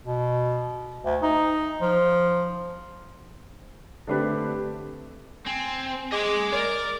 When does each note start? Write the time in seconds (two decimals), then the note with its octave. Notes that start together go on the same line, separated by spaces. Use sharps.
0.04 B2
1.05 D2
1.22 D#4
1.81 F3
4.07 D3 A3 C4 D4 G4 B4
5.47 C4 G#5
6.12 G#4 D#5 C6 D6
6.53 A#4 D5